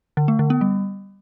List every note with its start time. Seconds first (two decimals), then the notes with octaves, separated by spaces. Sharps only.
0.17 D3
0.28 A3
0.39 D3
0.50 B3
0.61 G3